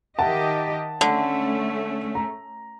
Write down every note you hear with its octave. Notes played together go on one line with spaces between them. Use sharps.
D#3 G4 D#5 E5 F#5 A5
D3 A3 C#4
A#5